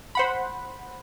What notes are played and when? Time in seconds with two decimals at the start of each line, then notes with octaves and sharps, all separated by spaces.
0.15 C5 F#5 B5